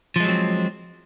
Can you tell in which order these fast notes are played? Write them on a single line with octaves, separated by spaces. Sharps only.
F3 G#3 F#3 C4